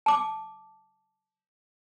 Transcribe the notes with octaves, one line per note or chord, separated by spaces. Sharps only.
A5 D6